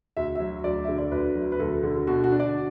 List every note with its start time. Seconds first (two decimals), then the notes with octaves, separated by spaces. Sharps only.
0.17 D2 E5
0.35 F#3 E5
0.64 D2 D5
0.85 D3 E5
0.99 D5
1.12 D2 B4
1.35 F#3
1.52 B4
1.60 D2 A4
1.83 D3
2.07 B2 F#4
2.24 F#4
2.32 D4
2.40 D5